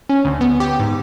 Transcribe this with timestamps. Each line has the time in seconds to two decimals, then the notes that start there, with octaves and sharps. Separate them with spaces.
0.09 C#4
0.25 D2
0.41 B3
0.60 G4
0.80 G#2